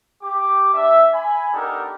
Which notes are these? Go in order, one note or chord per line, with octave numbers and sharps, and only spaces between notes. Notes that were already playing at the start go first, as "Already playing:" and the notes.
G4 D6
D4 E5
G#5 B5
B3 D4 D#4 G4 A4 A#4